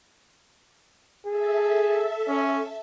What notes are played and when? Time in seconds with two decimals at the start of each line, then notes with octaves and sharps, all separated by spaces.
1.26 G#4 A4 E5
2.28 C#4